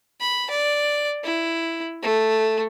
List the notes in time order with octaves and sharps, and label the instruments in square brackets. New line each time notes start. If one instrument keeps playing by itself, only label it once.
[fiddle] B5
D5
E4
A3